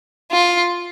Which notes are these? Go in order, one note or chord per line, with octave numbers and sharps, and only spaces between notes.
F4